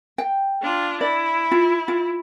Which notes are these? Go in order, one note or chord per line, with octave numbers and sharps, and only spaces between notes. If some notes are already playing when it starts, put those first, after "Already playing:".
G5
D4 F4
E4 D5
F4
F4